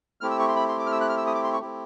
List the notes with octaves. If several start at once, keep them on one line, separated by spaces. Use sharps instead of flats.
A3 C4 E4 G4 F6
E6
C#6
C6
B5
C6
D6
F6
E6
F#6
F6
E6
D#6
D6
C6
C#6
A3 C4 E4 G4